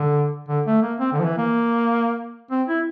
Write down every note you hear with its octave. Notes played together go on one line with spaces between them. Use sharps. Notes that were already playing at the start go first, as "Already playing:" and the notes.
Already playing: D3
D3
A3
A#3
C4
D3
F3
E3
A#3
C4
E4